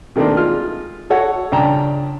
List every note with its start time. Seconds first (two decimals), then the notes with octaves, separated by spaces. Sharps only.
0.16 C3 D#3 A3 A#3 C4 D4
0.37 G#3 F4 F6
1.10 F#4 A4 C#5 F#5
1.52 C#2 G2 D5 G5 A5 A#5